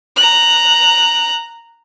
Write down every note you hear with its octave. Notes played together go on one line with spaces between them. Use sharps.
A#5 F#6